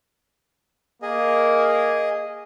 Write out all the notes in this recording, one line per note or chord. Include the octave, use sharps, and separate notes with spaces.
A#3 G#4 D#5